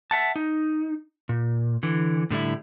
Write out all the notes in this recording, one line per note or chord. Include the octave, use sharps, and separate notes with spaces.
E5 F#5 A5
D#4
A#2
D3 E3
A2 D3 G3 E4